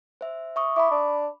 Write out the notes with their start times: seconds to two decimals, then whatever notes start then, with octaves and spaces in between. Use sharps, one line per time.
0.21 C5 E5
0.56 E5 C#6 D#6
0.76 E4 B5 D6
0.91 D4